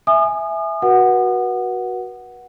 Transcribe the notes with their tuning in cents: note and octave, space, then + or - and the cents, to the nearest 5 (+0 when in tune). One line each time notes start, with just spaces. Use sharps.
E5 +0 G#5 +0 D#6 -35
F#4 +0 B4 -35 F#5 +0